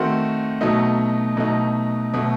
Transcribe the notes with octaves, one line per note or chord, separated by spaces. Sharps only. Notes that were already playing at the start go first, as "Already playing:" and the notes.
Already playing: D#3 A3 C4 F#4
B2 F#3 A3 D#4
B2 F#3 A3 D#4
B2 F#3 A3